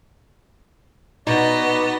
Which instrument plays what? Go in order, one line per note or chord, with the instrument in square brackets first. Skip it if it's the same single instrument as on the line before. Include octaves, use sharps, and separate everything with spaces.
[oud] B2 [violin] B3 D#5 [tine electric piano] D#4 [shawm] D5